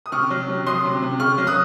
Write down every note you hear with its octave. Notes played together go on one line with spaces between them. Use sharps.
D#6
C3 C#6 F6
F#3
C3
F#3 C6 D#6
C3
C3
C#3 C#6 F6
F#3
D#6 F#6